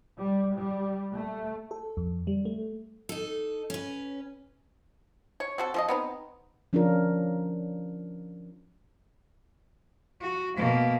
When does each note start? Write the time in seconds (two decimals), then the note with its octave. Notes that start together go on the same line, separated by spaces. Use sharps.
0.19 G3
0.56 G3
1.14 A3
1.71 A4
1.97 F2
2.27 G3
2.45 A3
3.09 D#4 A4
3.70 C#4 B4
5.40 C#5
5.58 C4 F#4 A4
5.74 F3 A4 D#5
5.88 B3 C4 D#4
6.73 F3 C#4 D4 F4 A#4
10.21 F#4
10.56 B2 A#3